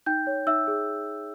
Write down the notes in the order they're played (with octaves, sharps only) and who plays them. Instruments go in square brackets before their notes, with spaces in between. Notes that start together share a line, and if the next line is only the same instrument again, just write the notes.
[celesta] D#4 G5 G6
C#5
D#4 E5 E6
G#4